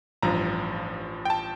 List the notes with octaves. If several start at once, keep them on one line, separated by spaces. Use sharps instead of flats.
A1 G2 F3 A#5
G5
A5